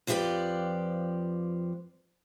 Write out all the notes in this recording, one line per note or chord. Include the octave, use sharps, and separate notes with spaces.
F2 F3 E4 G4 B4 D5